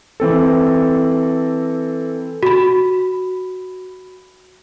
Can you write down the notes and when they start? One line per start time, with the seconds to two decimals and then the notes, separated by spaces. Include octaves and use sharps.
0.20 E3 C4 A4
2.43 F#4 B5